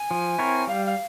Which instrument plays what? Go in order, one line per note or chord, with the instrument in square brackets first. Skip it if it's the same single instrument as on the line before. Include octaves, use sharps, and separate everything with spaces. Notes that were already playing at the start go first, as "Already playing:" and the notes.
Already playing: [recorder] G#5
[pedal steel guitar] F3
C4 E4 A#4 C#5
[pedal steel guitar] G3 [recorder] F5
[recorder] F5